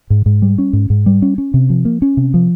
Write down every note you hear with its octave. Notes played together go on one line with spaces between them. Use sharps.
G#2
G#2
G3
C#4
G#2
G#2
G3
C#4
C#4
C3
F3
A#3
C#4
C3
F3